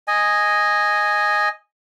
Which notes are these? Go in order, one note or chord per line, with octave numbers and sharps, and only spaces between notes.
D#5 G#5